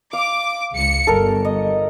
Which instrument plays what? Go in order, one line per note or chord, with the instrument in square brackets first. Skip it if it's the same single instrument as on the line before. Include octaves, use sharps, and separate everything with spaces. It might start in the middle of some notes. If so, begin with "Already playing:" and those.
[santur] F5 [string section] D6
[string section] C#2 C#7
[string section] G1 [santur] A4 A#4
[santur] D#5